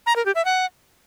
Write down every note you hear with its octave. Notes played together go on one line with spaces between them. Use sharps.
A#5
A#4
G4
E5
F#5